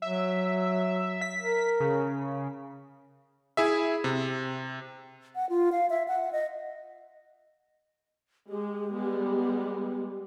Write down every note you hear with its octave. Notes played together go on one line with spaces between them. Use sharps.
F#3 E5
B6
A#4
C#3
E4 G#4 E5
C3
F#5
F4
F5
E5
F#5
D#5
G#3 G4
G3 G#3 B3